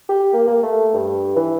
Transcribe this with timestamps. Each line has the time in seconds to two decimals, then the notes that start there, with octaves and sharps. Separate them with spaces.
0.09 G4
0.33 A#3
0.47 A#3
0.63 A3
0.93 G2
1.36 E3